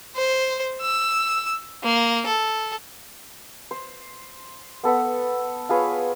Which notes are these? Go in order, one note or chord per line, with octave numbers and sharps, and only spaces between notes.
C5
E6
A#3
A4
C5
B3 A4 B4 F#5
F4 G#4 B4 C#5